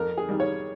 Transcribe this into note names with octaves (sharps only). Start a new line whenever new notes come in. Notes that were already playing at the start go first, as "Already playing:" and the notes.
Already playing: F2 A#4
G#4
D#3 G3
C#5